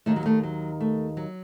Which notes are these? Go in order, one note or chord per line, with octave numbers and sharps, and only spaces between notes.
D#2 D#3 A3
F#3
A3
F#3
A3
F#3